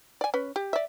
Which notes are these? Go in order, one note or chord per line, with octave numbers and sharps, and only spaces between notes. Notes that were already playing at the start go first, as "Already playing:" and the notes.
D5 G#5
C#4 B4
G4
D5 E5